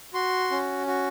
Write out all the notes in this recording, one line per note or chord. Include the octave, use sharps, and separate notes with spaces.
F#4 C6
C#4
F#4